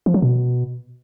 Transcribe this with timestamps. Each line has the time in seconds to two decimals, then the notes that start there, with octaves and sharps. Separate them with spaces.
0.06 F3
0.14 F#3
0.22 B2